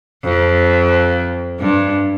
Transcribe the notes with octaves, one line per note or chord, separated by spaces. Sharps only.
F2
G2